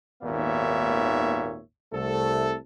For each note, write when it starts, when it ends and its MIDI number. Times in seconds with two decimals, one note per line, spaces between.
0.23 1.60 32
0.23 1.60 39
0.23 1.60 46
0.23 1.60 59
0.23 1.60 73
0.23 1.60 76
1.93 2.56 36
1.93 2.56 57
1.93 2.56 69